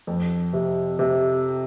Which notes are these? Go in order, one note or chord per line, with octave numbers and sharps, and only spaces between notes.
F2
C3
C3